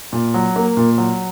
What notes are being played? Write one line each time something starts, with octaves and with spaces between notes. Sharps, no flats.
A#2
F#3
A#3
A#2
F#3